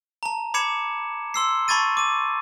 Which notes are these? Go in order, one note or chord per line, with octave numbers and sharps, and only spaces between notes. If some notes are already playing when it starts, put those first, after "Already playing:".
A5 A#5
B5 D6 G#6 C#7 E7
C6 E6 C7
A5 B5 C#6 G#6 A6 D#7
D6 D#7